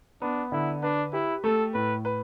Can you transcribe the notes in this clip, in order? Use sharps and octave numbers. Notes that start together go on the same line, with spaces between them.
B3 D4
D3 E4
D4 B4
E4 G4
A3 A4
A2 B4
B4